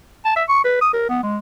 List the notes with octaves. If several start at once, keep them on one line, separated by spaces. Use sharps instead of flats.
A5
E5
C#6
B4
D#6
A#4
B3
G#3